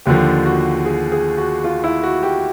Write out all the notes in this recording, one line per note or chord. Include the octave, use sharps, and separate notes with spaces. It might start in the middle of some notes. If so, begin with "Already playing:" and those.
D#2 D3 F3 G4
F#4
G#4
G#4
F#4
F4
E4
F#4
G4